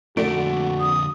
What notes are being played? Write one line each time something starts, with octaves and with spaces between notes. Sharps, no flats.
F2 D3 A3 F#4 D5 D7
D#6